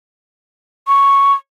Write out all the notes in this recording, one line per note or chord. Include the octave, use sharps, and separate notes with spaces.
C#6